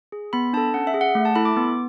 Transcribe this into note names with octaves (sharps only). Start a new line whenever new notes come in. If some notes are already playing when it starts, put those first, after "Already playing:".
G#4
B3 B5
D4 A4 A5
C#4 F#5
E5
G#4
F#5
A3
A5
E4 A4 B5
D6
B3